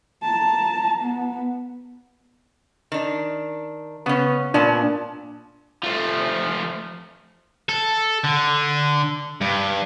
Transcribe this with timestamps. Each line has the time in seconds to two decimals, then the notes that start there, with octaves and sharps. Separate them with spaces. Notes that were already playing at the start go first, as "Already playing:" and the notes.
0.23 A5 A#5
1.01 B3
2.92 D#3 D4
4.06 C#3 B3 C#4
4.54 A#2 B3 D4 D5 A5
5.84 F3 A3
7.69 A4
8.24 D3
9.41 G2